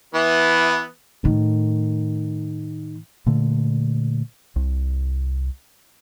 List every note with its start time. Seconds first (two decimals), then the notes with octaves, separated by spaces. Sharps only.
0.14 E3 B3 E4
1.24 A2 D#3
3.26 A#2 D3 A3
4.56 C2